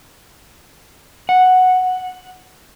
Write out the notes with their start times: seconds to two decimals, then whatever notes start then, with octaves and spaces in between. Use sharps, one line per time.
1.29 F#5